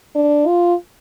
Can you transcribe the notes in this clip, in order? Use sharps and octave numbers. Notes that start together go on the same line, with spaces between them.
D4
F4